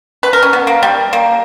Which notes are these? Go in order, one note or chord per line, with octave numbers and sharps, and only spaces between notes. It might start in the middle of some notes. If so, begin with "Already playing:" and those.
B4
A#4
C#4
B3
A#3
G3
A#3